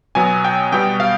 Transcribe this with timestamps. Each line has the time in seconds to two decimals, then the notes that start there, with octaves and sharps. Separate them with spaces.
0.15 B2 F#3 B3 G#5
0.44 G5
0.72 B2 G3 B3 G5
1.00 F5